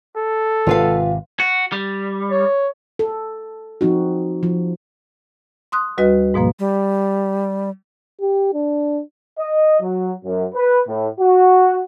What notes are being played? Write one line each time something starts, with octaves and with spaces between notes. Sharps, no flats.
A4
G#1 C3 F4 B4 F5
F#4
G3
C#5
A4
F3 C4 D#4 F#4
F3
C6 D#6 F#6
D2 G3 F#4 B4 D#5
G#2 B2 F3 A#3
G3
G4
D4
D#5
F#3
F#2
B4
A2
F#4